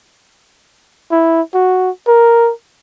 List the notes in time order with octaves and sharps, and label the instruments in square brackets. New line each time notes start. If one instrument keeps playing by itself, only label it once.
[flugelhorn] E4
F#4
A#4